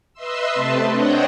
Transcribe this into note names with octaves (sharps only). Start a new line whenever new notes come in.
B4 D#5 E5 C6 E6
C3 A3 C4 B4 A5
D4 C5 C#5 D#5 F#5 G5